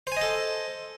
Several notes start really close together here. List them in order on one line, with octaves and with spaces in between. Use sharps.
C5 G#5 D#5 A4